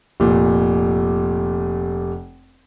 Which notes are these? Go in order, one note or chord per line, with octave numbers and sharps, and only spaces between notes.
F1 A#2